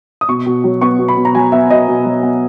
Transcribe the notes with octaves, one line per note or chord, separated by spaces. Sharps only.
D#6
B2 C#6
B2
F#3
B3 C#6
B2
B5
B2
A#5
F#3 G#5
B3 E5
B2 D#5
B2
F#3
B3